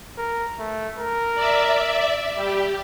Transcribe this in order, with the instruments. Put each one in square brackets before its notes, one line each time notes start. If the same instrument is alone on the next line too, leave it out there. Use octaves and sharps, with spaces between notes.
[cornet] A#4
A3
A#4
[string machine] D5 E5
[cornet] G3 [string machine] G4